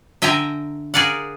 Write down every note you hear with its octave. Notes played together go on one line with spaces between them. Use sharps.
D3 E5 G5 G#5 A#5
G#4 A#4 D5 F5 F#5